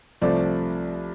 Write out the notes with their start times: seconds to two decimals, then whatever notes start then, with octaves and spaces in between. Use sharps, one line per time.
0.21 C2 C3 F3 A3 D5